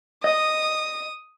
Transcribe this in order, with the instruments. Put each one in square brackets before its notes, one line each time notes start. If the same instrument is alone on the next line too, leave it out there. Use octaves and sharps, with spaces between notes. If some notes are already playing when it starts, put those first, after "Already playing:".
[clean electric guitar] D#5 [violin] D#6